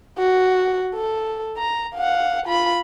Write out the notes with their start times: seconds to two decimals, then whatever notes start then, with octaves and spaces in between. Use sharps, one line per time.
0.18 F#4
0.95 A4
1.57 A#5
1.96 F5 F#5
2.46 F4 B5